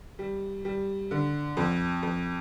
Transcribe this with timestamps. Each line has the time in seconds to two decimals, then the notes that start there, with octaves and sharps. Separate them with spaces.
0.19 G3
0.65 G3
1.11 D3
1.57 F2
2.03 F2